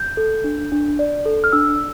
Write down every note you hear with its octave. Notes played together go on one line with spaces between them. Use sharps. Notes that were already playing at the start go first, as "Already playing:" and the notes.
Already playing: G6
A4
D4
D4
D5
A4
F6
D4 E6